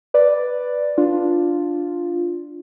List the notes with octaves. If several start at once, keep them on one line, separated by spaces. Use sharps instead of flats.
B4 D5
D4 F4